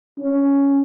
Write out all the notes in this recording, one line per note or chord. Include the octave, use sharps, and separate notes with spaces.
C#4